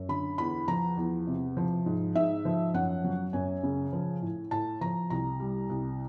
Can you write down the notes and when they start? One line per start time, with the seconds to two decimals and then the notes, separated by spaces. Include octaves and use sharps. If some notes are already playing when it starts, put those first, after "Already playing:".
Already playing: F#2
0.09 D3 B5
0.38 E2 B5
0.68 F3 A#5
0.97 E2
1.27 C3
1.57 F3
1.86 G#2
2.15 G#2 E5
2.45 F3
2.74 F#2 F#5
3.04 F#3
3.33 F#2 G#5
3.63 C#3
3.93 F3
4.22 A2
4.51 A2 A5
4.81 F3 A#5
5.10 C2 A#5
5.40 G3
5.70 C2